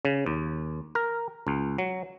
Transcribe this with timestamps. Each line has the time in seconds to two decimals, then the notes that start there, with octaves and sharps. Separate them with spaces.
0.05 C#3
0.26 D#2
0.95 A#4
1.47 C#2
1.78 F#3